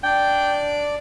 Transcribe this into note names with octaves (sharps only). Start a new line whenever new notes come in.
D4 D5 G5